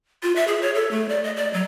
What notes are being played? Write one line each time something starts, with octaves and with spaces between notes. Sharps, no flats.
F4
E5
G#4
C#5
A4
A3
D5
D#5
D5
F#3